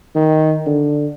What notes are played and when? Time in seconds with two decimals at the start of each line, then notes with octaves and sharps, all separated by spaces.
0.15 D#3
0.67 D3